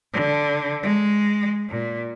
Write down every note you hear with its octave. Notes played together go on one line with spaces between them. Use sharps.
D3
G#3
A#2